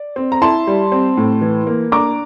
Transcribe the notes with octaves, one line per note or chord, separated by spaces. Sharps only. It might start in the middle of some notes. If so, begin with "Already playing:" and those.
Already playing: D5
C4
A#5
E4 A5 C6
G3
C4
A2
E3
A#3
D4 A#5 D6